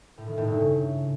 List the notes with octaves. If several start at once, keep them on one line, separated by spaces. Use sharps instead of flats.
A2
D#3
A2
G2
C#3